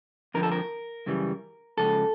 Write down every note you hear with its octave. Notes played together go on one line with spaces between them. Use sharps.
F2 D3 F3 A#4
A4
A#4
F#2 C#3 E3 G3
C#2 C#3 F3 A4